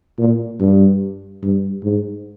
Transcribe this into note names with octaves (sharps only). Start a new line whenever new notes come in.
A#2
G2
G2
G#2